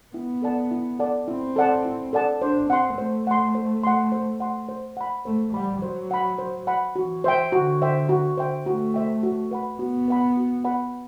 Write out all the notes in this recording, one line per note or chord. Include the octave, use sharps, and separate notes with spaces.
B3 E4
A4 D5 F#5 A5
E4
A4 D5 F#5 A5
C4 E4
A4 D5 F#5 A5
E4
A4 D5 F#5 A5
D4 C5
C4 F#5 C6
A3 C5
F#5 C6
C5
F#5 C6
C5
F#5 C6
C5
F#5 B5
A3 C5
G3 F#5 B5
F#3 C5
F#5 B5
C5
F#5 B5
E3 F#4
C5 E5 G5
D3 F#4
C5 E5 G5
F#4
C5 E5 G5
A3 F#4
C5 E5 G5
F#4
B4 F#5 B5
B3 F#4
B4 F#5 B5
F#4
B4 F#5 B5